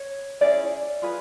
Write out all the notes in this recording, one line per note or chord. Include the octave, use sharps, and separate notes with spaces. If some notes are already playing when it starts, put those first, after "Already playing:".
Already playing: C#5
C#4 E4 G#4 D5
F4 G#4 B4